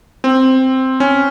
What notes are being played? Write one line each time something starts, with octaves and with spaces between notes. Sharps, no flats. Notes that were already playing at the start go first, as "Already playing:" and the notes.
C4
C#4